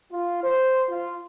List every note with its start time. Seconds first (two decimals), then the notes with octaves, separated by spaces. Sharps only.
0.13 F4
0.44 C5
0.90 F4